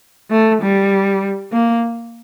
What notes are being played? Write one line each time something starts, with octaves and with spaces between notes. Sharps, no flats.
A3
G3
A#3